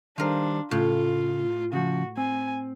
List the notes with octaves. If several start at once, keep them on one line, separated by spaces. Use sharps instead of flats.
D#3 G3 D4 F4 A#4 C5
A2 C#3 F4
C#3 F3 F#4
C4 G#5